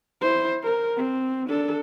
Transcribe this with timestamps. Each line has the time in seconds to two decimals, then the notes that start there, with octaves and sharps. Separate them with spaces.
0.21 E4 C5
0.63 A#4
0.97 C4
1.49 D4 A4